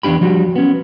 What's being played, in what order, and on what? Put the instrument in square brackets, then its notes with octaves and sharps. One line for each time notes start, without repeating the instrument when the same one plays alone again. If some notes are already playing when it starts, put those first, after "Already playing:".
[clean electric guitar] E2 G#2 D4 G4 B5
F3 G3 F#4
B3 C#4